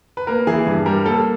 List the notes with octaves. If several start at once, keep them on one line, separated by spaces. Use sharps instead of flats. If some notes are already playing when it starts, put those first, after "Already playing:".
B4
A#3 A#4
E3 G#4
G2
G3 A#4
A#3 A4